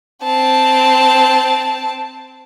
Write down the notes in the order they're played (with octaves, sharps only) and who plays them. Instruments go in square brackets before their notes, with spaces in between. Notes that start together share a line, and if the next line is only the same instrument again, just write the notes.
[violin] C4 A5